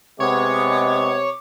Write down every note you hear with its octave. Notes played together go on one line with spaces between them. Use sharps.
C3 G#3 B3 C#5 D6